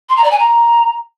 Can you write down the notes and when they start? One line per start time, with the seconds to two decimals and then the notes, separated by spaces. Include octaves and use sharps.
0.09 C6
0.16 A#5
0.24 D5
0.31 G#5
0.38 A#5